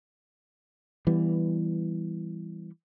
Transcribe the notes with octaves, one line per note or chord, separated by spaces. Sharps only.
E3 G3 B3